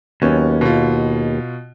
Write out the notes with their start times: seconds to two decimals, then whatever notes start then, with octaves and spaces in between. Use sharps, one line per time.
0.22 D#2 F#3 B3 C#4
0.61 B2 F4